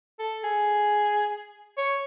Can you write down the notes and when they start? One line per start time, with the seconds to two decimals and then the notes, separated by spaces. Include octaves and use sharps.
0.19 A4
0.43 G#4
1.77 C#5